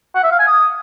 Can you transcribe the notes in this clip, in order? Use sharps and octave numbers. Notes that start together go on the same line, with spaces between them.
F#5
E5
F5
G#5
D#6